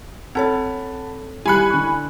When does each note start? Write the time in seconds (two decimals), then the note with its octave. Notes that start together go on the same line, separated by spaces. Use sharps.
0.35 C4 A4 C#5 F#5 A5 B5
1.46 G3 E4 G#5 B5 F#6 C#7
1.70 D3 C#6